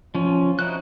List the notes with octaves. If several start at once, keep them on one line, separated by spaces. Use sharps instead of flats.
F3 C#4
D#4 E4 F#4 C5 F#6